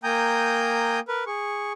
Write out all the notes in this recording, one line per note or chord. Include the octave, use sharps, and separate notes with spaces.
A#3 G5 G#5 A#5 D#6 G6
A#4 B4
G#4 C#6